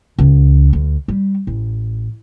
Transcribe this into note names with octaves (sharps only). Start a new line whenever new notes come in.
C#2
D2
G3
A1